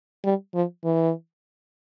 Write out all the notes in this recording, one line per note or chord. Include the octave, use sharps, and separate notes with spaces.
G3
F3
E3